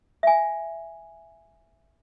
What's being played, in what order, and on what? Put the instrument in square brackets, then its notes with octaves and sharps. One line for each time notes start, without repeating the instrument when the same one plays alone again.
[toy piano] E5 G#5